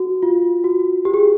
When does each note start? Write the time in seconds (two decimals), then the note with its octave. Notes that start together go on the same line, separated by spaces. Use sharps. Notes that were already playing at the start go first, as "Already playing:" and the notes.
Already playing: F#4
0.23 F4
0.64 F#4
1.05 G4
1.14 G#4